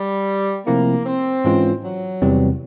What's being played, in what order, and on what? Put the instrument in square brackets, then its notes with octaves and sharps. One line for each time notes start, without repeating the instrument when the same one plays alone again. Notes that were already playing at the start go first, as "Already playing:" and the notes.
Already playing: [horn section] G3
[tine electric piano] C3 F3 A3 C4 E4 [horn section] A#3
[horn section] C4
[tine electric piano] G#2 E3 G#3 C#4 F4
[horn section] F#3
[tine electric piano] E2 C3 E3 G3 C4